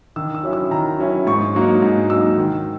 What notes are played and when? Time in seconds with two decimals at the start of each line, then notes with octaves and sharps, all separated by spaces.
0.16 D#3 E6
0.35 E6
0.43 F#3 C#4 E4
0.53 E6
0.71 D#3 A#5
0.99 F#3 C#4 E4
1.27 G#2 C#6
1.55 F#3 A#3 D#4
1.82 G#2
2.10 F#3 A#3 D#4 E6
2.37 D#3